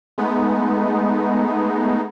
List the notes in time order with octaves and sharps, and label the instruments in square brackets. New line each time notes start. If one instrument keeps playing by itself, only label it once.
[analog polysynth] G#3 A3 B3 D#4